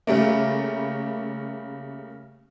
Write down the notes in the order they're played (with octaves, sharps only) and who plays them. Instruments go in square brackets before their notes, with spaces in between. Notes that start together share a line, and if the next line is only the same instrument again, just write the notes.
[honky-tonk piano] C#3 G3 A3 A#3